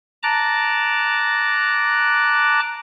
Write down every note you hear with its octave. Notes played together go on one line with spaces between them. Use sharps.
A5 A#5 D6 F#6